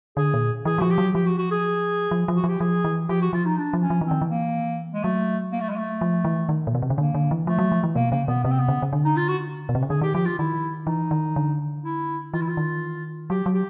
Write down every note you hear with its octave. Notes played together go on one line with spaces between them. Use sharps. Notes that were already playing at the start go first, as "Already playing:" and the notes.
D3 G#4
A#2
E3 G#4
F#3
F3 F#4
G4
F#3
F3 G4
F#4
F#4
G#4
F3
F3
F#4
F3 G4
F3 G#4
E3
F3 G4
F#4
F3 F4
D#4
D4
F3
C#4
F3
E3
D#3 C4
E3
A#3
G#3
F#3 A3
A#3
A3
G#3
A3
F3
E3
D#3
A#2
B2
C3
C#3
D3 A#3
D3
E3
F3 A3
F#3
F3
E3
B2 A#3
C#3 A#3
B2 B3
C3 B3
C4
B3
C#3
C#3
D3
D#4
F4
F#4
B2
C3
C#3
D3 G#4
D#3 G4
F3 G4
F4
D#3 E4
E3 D#4
D#3
D3
E4
E3 F4
E4
F4
D#3
F#3 G4
F#3
G4